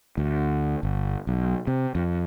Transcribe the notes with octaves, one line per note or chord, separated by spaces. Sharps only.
D2
G1
B1
C3
F2